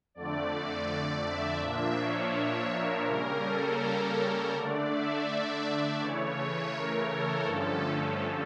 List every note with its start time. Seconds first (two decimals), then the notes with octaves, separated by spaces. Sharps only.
0.15 F2 D3 A3 D5
0.88 D5
1.24 E5
1.61 A#2 F3 A#3 D4
1.97 C#5
2.70 A#4
3.07 C#3 G3 A#3 C#4 A#4
3.44 A4
3.81 A#4
4.54 D3 A3 D4 D5
4.90 E5
5.27 D5
6.00 C#3 E3 A3 C#5
6.74 A#4
7.10 A4
7.46 G2 D3 F3 A3 C#4